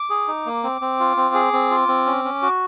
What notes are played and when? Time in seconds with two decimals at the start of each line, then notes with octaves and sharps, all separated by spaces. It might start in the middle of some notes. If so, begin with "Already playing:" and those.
Already playing: D6
0.10 G#4
0.28 D#4
0.46 A#3
0.64 C4
0.81 C4
1.00 F4
1.17 C4
1.34 G#4
1.53 C4
1.70 F4
1.88 C4
2.06 C#4
2.25 C#4
2.42 F#4